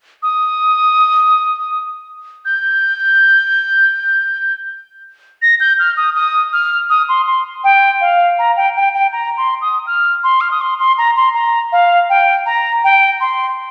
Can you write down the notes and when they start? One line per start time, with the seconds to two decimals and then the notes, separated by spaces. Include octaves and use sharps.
0.23 D#6
2.45 G6
5.42 A#6
5.60 G6
5.79 F6
5.97 D#6
6.15 D#6
6.53 F6
6.90 D#6
7.09 C6
7.27 C6
7.64 G5
8.01 F5
8.39 A#5
8.57 G5
8.76 G5
8.94 G5
9.13 A#5
9.37 C6
9.61 D#6
9.87 F6
10.24 C6
10.41 F6
10.51 D#6
10.61 C6
10.80 C6
10.98 A#5
11.17 C6
11.34 A#5
11.72 F5
12.10 G5
12.46 A#5
12.84 G5
13.21 C6